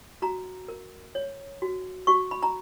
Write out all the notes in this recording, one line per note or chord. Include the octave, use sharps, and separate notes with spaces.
F#4 A#5
A#4
C#5
F#4
F#4 C#6
B5
A#5